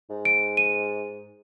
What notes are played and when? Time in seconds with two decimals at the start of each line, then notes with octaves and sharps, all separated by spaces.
0.10 G#2
0.25 D7
0.57 D#7